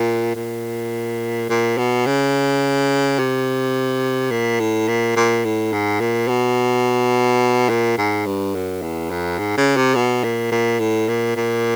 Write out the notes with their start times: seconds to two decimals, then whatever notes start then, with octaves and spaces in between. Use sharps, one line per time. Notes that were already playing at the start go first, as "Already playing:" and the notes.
Already playing: A#2
0.36 A#2
1.50 A#2
1.78 B2
2.06 C#3
3.19 C3
4.31 A#2
4.60 A2
4.88 A#2
5.16 A#2
5.45 A2
5.73 G#2
6.00 A#2
6.28 B2
7.69 A#2
7.98 G#2
8.26 G2
8.55 F#2
8.82 E2
9.11 F2
9.39 G#2
9.58 C#3
9.77 C3
9.95 B2
10.24 A#2
10.52 A#2
10.80 A2
11.08 A#2
11.36 A#2